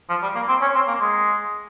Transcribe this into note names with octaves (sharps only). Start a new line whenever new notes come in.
F3
G3
A#3
C4
C#4
C4
A#3
G#3